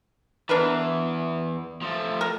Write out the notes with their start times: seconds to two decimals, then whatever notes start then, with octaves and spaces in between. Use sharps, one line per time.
0.49 E2 E3 D4 A#4 B4
1.82 F3 A3
2.21 A#4